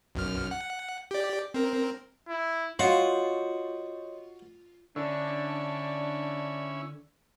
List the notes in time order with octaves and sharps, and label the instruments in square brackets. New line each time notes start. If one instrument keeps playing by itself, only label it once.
[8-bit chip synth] B1 F#2 F6
F#5
G4 D5
C4 A#4
[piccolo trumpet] E4
[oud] F4 [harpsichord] F#4 [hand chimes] C#5 D#5 C6
[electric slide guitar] D3 [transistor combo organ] C#4 E4 [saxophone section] D4